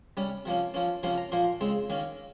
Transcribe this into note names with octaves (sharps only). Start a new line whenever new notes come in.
C3 G3 C#4
C3 F3 A#3 C#4
F3 A#3 C#4
C3 F3 A#3 C#4 C6
A#5
A#2 F3 A#3 C6
C#3 G#3 C4
D#3 A#3 C#4